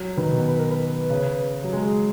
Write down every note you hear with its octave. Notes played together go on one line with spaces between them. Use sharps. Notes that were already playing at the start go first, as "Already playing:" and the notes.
Already playing: F#3
D#3 B4
B2
B4
A#4
B4
C#3
F#3
G#3 G#4